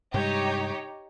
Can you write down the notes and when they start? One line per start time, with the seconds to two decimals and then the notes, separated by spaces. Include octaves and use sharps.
0.14 G2 C3 G#3 D#4 G4 C#5